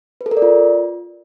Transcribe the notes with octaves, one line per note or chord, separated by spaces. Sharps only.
B4
A4
A#4
D5
F4